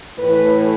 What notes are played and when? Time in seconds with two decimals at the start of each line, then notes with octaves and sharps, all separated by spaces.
0.18 A2 E3 B4